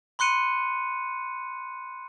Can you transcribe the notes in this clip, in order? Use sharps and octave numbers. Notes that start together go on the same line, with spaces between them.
B5 C6 F#6 C#7 D#7